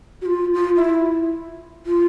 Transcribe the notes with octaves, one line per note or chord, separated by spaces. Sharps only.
F#4
F4
F4
E4
F4